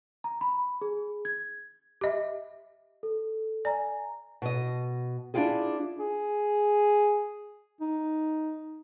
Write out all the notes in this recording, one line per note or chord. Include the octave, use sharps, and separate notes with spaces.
A#5
B5
G#4
G#6
G4 D#5 E5
A4
D5 G#5 A#5
B2 D#5
D4 E4 F4 G4 G#4
G#4
D#4